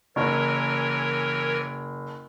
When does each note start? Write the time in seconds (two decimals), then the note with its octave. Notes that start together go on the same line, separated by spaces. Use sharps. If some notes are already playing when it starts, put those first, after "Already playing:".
0.16 F#1 E3 A#4 C#5